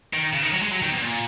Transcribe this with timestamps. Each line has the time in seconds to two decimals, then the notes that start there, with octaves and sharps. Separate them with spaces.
0.13 D#3
0.33 C#3
0.42 D#3
0.53 F#3
0.62 G#3
0.71 F#3
0.82 D#3
0.92 B2
1.02 A#2